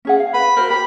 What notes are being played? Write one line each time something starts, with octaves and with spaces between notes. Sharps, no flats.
C#4 G#4 F#5
F5
B4 B5
F#4 A#4 C5
G4 B5